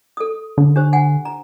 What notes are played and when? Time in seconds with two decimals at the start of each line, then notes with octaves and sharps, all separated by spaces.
0.17 A4 D#6
0.58 D3
0.76 D4 G4 C5
0.93 F#5 G#5
1.25 A#5